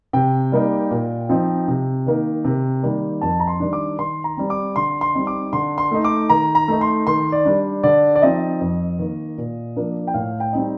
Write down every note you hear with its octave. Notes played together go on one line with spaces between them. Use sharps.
C3 G5
G3 A#3 D#4
A#2
F3 C4 D#4
C3
D#3 A#3 D#4
C3
D#3 G3 A#3
F2 A5
A#5
C6
D#3 G3 D4
D6
D#3 C6
A#5
G3 C4
D6
D3 C6
C6
G3 C4 D#4
D6
D3 C6
C6
A3 D#4
D6
D#3 A#5
A#5
A3 D#4
C6
D#3 C6
D5
G3 D4
D3 D5
D5
F3 C4 D#4 D#5
F2
D#3 A#3
A#2
F3 A#3 D4
G5
A2 F5
G5
G3 C4 D#4